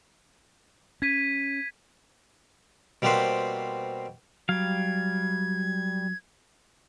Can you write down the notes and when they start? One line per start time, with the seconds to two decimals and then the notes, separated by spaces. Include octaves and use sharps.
1.02 C#4 G#6 B6 D#7
3.02 B2 G3 A#3 C4 B4 C5
4.49 F#3 G3 F5 G#6